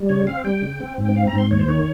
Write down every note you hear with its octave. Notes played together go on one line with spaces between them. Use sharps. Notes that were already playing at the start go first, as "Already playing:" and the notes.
Already playing: G3
C#3 C#5
C4 F5
G3 G5
C#3
C4
G#2
G5
C4 F5
A#5
G#2
C6
D#2 C#5
C5
D#3 C#5